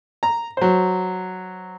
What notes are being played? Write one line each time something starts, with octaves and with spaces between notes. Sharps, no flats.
A#5
F#3 C5